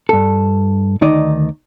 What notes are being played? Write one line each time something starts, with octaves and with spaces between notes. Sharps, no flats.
G2 A4
D2 D#3 D#4 D5 D#5